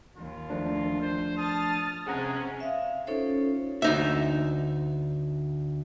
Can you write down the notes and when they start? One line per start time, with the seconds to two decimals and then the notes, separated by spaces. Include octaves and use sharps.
0.17 D#2 D#3 F4
0.50 F3 A3 D4
1.02 C5
1.37 A5 D#6 F6 A6
2.07 C3 G#3 C#4 G#4 F#5 A#5
2.60 E5 F5
3.07 C#4 D#4 F4 A4 C5 C#5
3.82 D2 D#4 E5